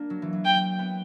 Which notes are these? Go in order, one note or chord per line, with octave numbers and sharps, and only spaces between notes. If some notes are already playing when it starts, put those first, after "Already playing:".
Already playing: A#3 D4
F#3
E3
F#3
G5
B3